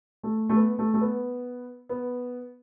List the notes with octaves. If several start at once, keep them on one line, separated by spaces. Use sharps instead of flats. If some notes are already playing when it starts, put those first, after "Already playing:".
A3
A3
B3
A3
A3
B3
B3